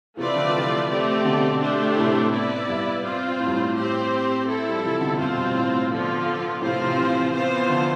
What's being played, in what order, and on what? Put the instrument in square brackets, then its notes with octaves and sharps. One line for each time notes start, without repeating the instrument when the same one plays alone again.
[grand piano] C3 E3 [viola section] A3 C4 F4 B4 D5
[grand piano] D3 F3
F3
C3 E3
[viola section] A3 C4 G4 D5
[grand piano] B2 D3
[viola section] A3 D4 G4 C5
[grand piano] A2 C3
[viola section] B3 E4 B4 D5
[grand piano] G2
[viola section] C4 F4 C5
[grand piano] A2
G2
A2
[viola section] C4 G4 C5
C4 E4 A4
[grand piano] G3
F3
C3 E3
B2 D3
[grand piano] G2 B2 [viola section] C4 F4 C5
[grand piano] G2
A2
[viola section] D3 F3 B3 F4
[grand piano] A2 C3 [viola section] F3 C4 F4 C5
[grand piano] C3 E3
C3 E3
[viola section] E3 B3 F4 C5
[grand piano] D3 F3